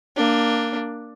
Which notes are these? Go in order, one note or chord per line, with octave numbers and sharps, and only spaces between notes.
A#3 D4